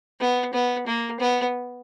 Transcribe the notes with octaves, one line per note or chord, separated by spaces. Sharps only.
B3
B3
A#3
B3